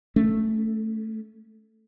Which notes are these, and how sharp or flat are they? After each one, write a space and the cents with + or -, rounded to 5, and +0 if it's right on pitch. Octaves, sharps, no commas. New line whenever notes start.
A3 +0 C#4 +0